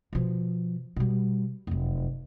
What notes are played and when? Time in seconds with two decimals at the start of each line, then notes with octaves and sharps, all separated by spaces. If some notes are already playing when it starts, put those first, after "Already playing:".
0.13 B2 F3
0.96 B2 G3
1.67 F1 F#2